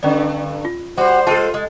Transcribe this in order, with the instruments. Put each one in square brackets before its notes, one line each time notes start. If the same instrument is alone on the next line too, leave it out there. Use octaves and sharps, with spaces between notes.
[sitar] G2 D3 [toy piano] C#4 D5
[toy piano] F4
[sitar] G3 [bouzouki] F#4 [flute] C5
[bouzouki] G#3 A4 [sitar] F4 [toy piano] G#4 G5 A5
[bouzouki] G#3